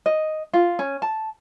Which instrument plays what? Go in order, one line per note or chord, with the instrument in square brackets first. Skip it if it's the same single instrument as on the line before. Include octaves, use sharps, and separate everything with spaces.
[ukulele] D#5
F4
C#4
A5